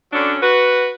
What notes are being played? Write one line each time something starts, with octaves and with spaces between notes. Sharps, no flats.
D3 F#3 C#4 D4
F#4 B4